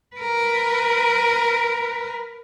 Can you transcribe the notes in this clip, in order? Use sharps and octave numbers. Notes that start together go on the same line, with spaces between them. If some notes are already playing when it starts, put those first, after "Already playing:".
A#4 B4